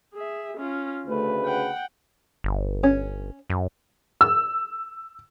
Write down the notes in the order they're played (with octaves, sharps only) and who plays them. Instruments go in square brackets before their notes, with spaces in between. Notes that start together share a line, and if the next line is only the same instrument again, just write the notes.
[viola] G#4 E5
C#4 F4
[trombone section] D2 C#3 B4 [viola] A3
[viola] F#5 G5
[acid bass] G1
[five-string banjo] C#4
[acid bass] F#2
[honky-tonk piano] E6